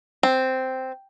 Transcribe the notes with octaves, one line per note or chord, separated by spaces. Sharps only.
C4